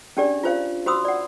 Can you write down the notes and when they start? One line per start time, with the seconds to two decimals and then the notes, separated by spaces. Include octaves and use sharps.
0.17 C#4 D4 G4 G#4 D5
0.44 F4 C5 F5
0.86 F#4 C5 B5 C6 D#6 E6
1.05 D5 F#5